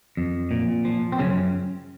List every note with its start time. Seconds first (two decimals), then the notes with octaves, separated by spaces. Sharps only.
0.17 F2
0.51 A#2
0.85 F3
1.12 C4
1.19 F#2 C#3 C#4